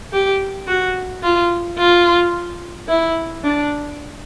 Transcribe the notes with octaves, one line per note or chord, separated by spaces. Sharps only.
G4
F#4
F4
F4
E4
D4